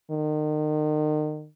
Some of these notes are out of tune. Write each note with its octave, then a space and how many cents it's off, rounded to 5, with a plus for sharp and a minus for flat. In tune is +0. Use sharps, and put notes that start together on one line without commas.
D#3 -35